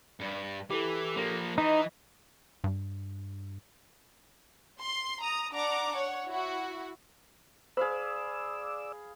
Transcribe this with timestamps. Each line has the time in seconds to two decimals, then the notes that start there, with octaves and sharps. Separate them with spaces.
0.20 G2
0.71 E3 G4 A4
1.16 F3 A#3
1.58 E3 D#4 D#5
2.64 G2
4.80 C6
5.21 A#5 D#6
5.52 D4 F#5 A#5 D6
5.91 C#5 F#5
6.26 E4 F#4
7.77 G#4 C5 D5 F5 B5 E6